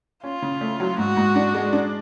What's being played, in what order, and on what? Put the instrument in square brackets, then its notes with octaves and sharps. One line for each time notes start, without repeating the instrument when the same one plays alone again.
[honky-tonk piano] C#4 [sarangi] F4
[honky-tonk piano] C#3
A3
F#3
[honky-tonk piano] G#2 [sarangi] F#4
[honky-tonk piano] G#2
D4
G#3
D4